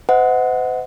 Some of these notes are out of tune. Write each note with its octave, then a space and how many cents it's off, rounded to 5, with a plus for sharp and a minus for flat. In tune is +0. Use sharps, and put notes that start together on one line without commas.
C5 -45 D#5 +35 F#5 +0